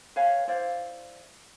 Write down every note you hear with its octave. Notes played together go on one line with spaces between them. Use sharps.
B4 C#5 F5 G#5
E4 C5 D5 F5